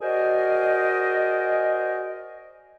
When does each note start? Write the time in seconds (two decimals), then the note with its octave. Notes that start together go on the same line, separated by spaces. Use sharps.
0.01 F#4 G#4 A#4 C5 D5 D#5